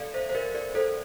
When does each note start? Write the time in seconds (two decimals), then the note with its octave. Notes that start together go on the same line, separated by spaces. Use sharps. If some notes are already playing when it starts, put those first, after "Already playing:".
Already playing: A4 D5 F5
0.14 C5 E5
0.29 C5
0.35 A#4 D5
0.55 A#4 D5
0.75 A4 C5